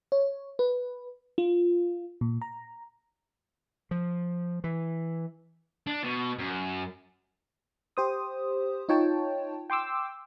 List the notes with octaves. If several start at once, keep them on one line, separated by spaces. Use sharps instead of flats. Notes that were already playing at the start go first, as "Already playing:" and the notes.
C#5
B4
F4
A#2
A#5
F3
E3
D4
B2
F#2
G4 C5 D#6
D#4 F4 C#5 G5 A5
G5 C6 D6 E6